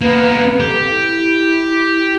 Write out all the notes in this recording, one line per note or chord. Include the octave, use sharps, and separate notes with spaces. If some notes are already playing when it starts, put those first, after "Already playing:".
A#3 B3 B4
G4 A4
E4